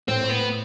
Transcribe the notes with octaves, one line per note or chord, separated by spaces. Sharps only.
A2 C4
B3